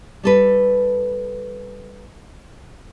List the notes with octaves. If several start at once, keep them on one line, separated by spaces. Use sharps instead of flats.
G3 A4 B4